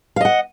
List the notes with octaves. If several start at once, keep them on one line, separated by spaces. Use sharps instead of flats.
D#5 F5 F#5